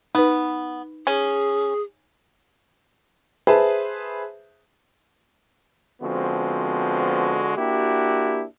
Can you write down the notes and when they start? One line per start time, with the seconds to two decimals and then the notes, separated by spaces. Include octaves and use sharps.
0.15 B3 D#4 B4
1.07 C#4 G#4
3.47 G#4 B4 C5 E5 A5
6.01 D3 F3 G#3 B3 C4 F#4
7.56 A#3 D4 E4 F#4 G4